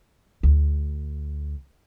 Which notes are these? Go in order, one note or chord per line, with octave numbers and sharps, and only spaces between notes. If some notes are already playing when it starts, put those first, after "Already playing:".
D2